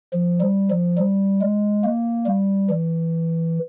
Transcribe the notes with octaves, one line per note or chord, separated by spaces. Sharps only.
F3
G3
F3
G3
G#3
A#3
G3
E3